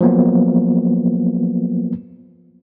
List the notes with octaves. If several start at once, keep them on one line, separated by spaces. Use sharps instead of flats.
F3 F#3 A#3 B3